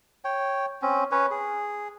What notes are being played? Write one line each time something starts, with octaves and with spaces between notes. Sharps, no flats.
C#5 G5
C4 C#4
C#4 B4 C#5
G#4